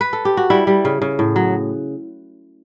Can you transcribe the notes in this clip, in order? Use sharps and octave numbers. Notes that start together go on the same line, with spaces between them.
B4
A4
G4
F#4
G3 E4
G3
C#3
C#3
A2
F#3